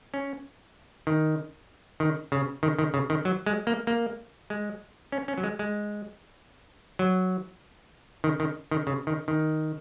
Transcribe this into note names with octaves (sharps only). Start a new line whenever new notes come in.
C#4
D#3
D#3
C#3
D#3
D#3
C#3
D#3
F#3
G#3
A#3
A#3
G#3
C#4
C#4
F#3
G#3
G#3
F#3
D#3
D#3
D#3
C#3
D#3
D#3